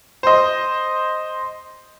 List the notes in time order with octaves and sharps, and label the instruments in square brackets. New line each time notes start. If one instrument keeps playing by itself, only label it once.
[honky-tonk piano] C5 D#5